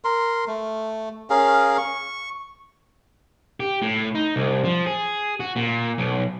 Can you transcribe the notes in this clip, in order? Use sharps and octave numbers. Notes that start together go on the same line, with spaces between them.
A#4 C6
A3
C#4 G#4 A#4 F5
C#6
G4
A2
D#4
C2
F3
G#4
F#4
A#2
B1